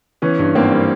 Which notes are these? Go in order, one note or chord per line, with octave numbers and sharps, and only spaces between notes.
E3 B3 C#4
G2
G#1 A#3 C4
G3